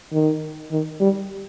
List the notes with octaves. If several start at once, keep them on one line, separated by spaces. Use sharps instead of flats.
D#3
D#3
G3